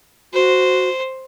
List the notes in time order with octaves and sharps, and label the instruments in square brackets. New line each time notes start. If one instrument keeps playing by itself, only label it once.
[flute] F#4 [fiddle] C5